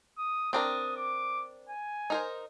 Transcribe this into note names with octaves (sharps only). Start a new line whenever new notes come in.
D#6
C4 D4 A#4 D#6
D6
G#5
D#4 A#4 C5